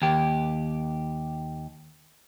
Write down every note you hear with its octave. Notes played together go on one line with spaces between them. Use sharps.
D#2 G4